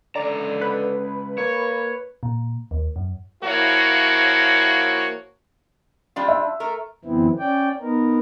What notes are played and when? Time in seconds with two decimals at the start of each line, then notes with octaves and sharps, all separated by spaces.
0.15 C#2 D3 D5 A#5
0.61 B4
1.38 A#3 C#5
2.23 A#2
2.71 D#2
2.96 F#2
3.43 F3 A#3 E4 F#4 C#5
6.16 G3 D4 F4
6.28 E5
6.60 A3 A#4
7.05 F#2 D3 E3 B3 C4 E4
7.39 C#4 D5 G5
7.81 B3 D#4 A#4